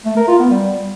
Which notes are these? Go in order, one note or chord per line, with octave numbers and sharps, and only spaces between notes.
A3
A#4
F4
B3
G3